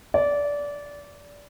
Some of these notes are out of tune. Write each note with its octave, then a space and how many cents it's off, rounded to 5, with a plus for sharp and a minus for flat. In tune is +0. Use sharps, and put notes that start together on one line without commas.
D5 -20